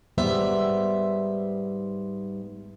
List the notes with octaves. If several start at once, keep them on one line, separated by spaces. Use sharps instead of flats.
G#2 G3 B3 C5 E5